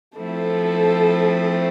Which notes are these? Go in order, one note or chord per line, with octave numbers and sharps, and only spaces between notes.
F3 A3 C4 E4 A4